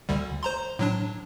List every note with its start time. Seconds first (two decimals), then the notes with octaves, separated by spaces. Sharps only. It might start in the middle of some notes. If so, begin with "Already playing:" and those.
0.09 D2 D3 G3
0.43 C5 A#5 C6
0.79 A2 F#3 D4